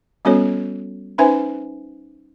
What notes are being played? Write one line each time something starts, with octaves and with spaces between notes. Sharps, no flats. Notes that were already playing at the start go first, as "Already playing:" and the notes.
G3 B3 C#4 F#4 A4 C#5
C#4 D#4 B4 C5 E5 G#5